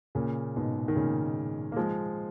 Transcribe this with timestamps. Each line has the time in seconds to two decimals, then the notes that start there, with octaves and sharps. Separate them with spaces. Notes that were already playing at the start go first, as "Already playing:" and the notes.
0.15 A#2 C#3
0.56 G#2 B2
0.88 D#3
0.96 A#2 C#3
1.72 A#3
1.76 F3 G#3